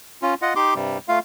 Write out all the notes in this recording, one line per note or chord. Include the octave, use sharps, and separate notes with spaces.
C#4 F4
F4 D#5 F#5
D#4 G4 C6 D6
G2 C3 G3
A3 F4 F5